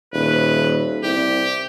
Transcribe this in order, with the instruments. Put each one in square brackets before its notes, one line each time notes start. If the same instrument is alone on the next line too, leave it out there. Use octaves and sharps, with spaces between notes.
[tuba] D#1 [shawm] B4
[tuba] C2 [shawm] G4